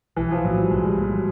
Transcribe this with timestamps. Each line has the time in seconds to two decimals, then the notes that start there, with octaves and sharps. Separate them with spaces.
0.16 B1 E3
0.31 F3
0.44 A2 F3 F#3 A#3
0.58 G3
0.71 B1 G#3
0.84 G3
0.98 A2 F3 F#3 A#3
1.11 F#3